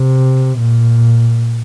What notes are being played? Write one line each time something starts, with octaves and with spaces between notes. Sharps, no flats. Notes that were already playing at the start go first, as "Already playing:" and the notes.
Already playing: C3
A#2